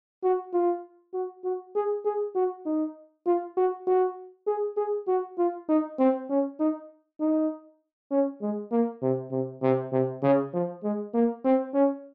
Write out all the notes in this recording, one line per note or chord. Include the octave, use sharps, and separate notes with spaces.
F#4
F4
F#4
F#4
G#4
G#4
F#4
D#4
F4
F#4
F#4
G#4
G#4
F#4
F4
D#4
C4
C#4
D#4
D#4
C#4
G#3
A#3
C3
C3
C3
C3
C#3
F3
G#3
A#3
C4
C#4